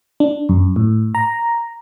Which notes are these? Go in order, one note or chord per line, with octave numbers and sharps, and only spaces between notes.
D4
F#2
A2
A#5